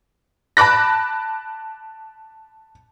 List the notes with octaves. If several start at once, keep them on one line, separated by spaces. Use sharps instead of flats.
A5 B5 D6 F#6 A#6